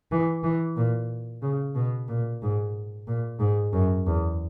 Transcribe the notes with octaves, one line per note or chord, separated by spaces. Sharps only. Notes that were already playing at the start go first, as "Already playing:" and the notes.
E3
E3
A#2
C#3
B2
A#2
G#2
A#2
G#2
F#2
E2